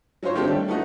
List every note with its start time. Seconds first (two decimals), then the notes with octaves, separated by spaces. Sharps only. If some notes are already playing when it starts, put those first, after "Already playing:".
0.23 F#3 C#4 F4 C5 C#5
0.35 D#3 A3 C4 D4 G4
0.48 G3
0.68 A3 B3 D#4 F#4